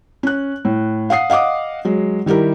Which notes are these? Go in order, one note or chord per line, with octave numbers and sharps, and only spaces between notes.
C#4 F#6
A2
F5 F#5 D#6 C7
D#5 F5 F#5 D6 D#6
F#3 G#3
D#3 G3 E4 G4 A#4